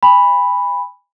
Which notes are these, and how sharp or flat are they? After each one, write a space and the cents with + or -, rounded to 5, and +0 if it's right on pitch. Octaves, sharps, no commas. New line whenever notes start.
G#5 -35 B5 +0